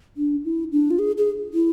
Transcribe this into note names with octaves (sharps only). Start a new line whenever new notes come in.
D4
E4
D4
F4
G#4
G#4
E4